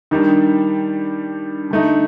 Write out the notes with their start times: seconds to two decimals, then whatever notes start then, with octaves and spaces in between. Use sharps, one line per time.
0.11 D#3 G3 D4
1.71 D3 A3 D#4